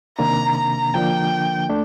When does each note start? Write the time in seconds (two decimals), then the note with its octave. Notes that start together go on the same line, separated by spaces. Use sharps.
0.18 C3 D#3 A#3 D4 A#5
0.57 A#5
0.94 D3 F3 A#3 D4 G5
1.69 A3 D4